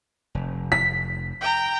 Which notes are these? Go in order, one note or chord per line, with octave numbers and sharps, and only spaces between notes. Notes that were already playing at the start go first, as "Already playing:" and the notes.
F1
B6
G5 A#5